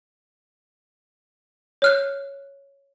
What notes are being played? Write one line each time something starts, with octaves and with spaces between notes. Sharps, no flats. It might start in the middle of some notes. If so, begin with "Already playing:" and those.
C#5 F6 F#6